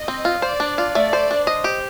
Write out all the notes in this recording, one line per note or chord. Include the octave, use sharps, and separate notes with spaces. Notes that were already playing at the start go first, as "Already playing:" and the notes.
Already playing: D#5
C4
F4
C5 D5
D4
F4
A3 D5
C5
D4
C5 D#5
G4